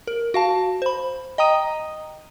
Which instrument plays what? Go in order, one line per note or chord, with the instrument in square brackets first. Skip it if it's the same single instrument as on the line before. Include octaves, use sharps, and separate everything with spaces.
[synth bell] A#4
F#4 F5 A5
C5 B5
D#5 G5 A#5 D#6 D#7